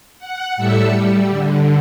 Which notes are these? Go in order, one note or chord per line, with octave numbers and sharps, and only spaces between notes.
F#5
A2 G3 A4 E5 E6 C#7
G3
D3